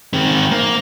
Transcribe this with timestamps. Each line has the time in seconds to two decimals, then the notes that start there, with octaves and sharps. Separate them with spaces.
0.13 D#3 C4
0.51 A#3